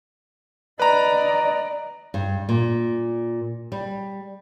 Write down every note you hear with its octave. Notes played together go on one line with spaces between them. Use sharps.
B4 D5 D#5 A#5
G2
A#2
G3